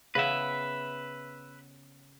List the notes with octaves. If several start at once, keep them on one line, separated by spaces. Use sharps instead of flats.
C#3 B3 B4 E5